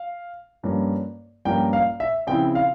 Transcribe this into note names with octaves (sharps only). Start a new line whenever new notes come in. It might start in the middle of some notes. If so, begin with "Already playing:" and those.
Already playing: F5
G2 F3 A#3 C#4
G2 F3 A#3 C#4 G5
F5
E5
C#3 F3 C4 E4 G5
F5